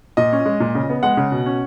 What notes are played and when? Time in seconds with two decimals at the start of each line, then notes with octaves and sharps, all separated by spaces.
0.17 A#2 D#5
0.32 C#4
0.46 G#3
0.60 A#2
0.75 C#3
0.89 B3
1.03 G#3 F#5
1.17 C#3
1.32 B2
1.46 C#4